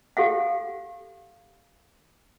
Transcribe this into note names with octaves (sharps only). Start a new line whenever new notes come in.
G4 A4 F5 F#5